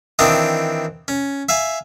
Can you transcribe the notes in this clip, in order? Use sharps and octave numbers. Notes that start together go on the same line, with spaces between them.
D#3 E3 C4 D4 F5 D#6
C#4
E5 F5 G#5